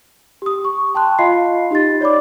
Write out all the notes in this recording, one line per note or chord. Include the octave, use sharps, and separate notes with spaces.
G4 D#6
C#6
G5 A5 C6 F#6
F4 D#5 F5 B5 C6 C7
D#4 G4 D#5 A6
C#5 D5 B5 D6